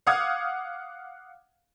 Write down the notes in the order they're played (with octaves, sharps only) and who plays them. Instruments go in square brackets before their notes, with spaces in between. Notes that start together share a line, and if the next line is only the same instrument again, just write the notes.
[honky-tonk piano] F5 F#5 D6 D#6 F6 G#6